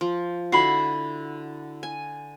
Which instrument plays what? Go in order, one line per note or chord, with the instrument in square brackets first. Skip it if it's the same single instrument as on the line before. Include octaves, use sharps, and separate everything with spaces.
[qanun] F3
[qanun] D3 E4 F#4 [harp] B5 C7
[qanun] G#5